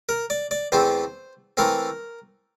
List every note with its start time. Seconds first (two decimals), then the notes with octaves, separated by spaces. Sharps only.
0.09 A#4
0.30 D5
0.51 D5
0.72 E2 E3 A3 C4 C5
1.57 E3 A3 C4 A#4